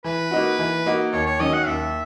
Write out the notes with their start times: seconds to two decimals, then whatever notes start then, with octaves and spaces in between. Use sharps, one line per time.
0.04 E3 B4
0.31 A#3 D#4 F#4
0.59 E3
0.86 A#3 D#4 F#4
1.13 D#2 C#5
1.26 C#5
1.40 D#3 F#3 C#4 D#5
1.53 F#5
1.67 D#2 E5